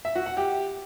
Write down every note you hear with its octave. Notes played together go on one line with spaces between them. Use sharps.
E5
F#4
F#5
G4